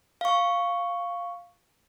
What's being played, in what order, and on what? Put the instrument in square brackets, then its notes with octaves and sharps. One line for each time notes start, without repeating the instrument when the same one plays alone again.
[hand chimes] F5 C#6